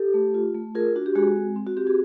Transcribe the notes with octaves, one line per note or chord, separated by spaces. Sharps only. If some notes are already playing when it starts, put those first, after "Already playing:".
Already playing: G4 A4
A3
F4
A3
F4 G#4 A#4
D4 F#4
G4
G#3 F#4 G#4
C4
C4
F#4
C4 G4
F#4 G#4